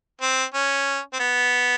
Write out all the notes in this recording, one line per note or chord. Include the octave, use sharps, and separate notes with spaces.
C4
C#4
C4
B3